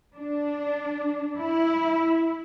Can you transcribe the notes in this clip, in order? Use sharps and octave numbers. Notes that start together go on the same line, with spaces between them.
D4
E4